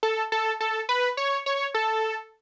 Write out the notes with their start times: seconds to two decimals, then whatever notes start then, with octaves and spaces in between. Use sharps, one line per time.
0.03 A4
0.32 A4
0.60 A4
0.89 B4
1.17 C#5
1.46 C#5
1.74 A4